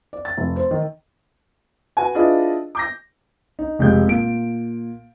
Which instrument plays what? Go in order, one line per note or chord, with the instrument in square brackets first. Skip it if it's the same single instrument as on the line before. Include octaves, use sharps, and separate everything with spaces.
[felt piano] D5
A6
F1
C5
D#3
[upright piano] F#4 B4 G#5
D4 E4 F4 G#4 B4 D#5
D6 G6 A#6
[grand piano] D#4
F1 G#3 G4 G6
A#2 D7